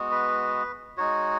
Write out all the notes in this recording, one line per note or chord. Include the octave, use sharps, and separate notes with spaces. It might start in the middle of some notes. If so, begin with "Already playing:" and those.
Already playing: G#3 B3 F#4
B4
G#3 D#4 F#4 C#5